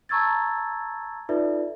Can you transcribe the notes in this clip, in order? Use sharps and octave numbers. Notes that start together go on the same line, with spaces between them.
A5 A#5 C#6 E6 G#6 A6
D#4 F4 A4 B4 D5 E5